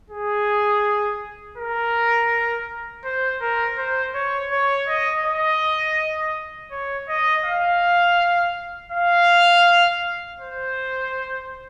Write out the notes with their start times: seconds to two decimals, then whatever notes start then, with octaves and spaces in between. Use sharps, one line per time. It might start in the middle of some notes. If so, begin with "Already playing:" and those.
0.10 G#4
1.58 A#4
3.05 C5
3.41 A#4
3.78 C5
4.15 C#5
4.51 C#5
4.88 D#5
5.25 D#5
6.72 C#5
7.09 D#5
7.46 F5
8.92 F5
10.39 C5